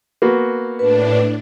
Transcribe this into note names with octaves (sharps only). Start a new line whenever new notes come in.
A#3 B3 F#4
A2 D4 B4